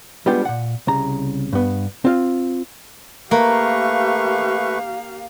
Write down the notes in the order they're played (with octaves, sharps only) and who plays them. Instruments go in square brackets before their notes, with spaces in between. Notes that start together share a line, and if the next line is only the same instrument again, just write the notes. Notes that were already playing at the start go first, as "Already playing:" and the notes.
[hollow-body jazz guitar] G3 G#3 B3 D4 F4 G4
A#2 F#5
C2 C#3 A#5
G2 B3
C4 F4 F5
[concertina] A3 B4 C#6 [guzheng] A#3 [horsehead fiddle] G4 F5